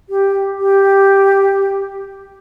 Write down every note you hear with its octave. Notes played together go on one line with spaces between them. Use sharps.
G4
G4